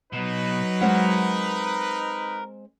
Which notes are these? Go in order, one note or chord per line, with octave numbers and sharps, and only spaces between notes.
B2 F#3 D#4 B4
G#3 C4 A#4 F#5